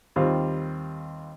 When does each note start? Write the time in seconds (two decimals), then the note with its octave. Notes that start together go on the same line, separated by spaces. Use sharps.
0.16 D#2 G3 C4 F4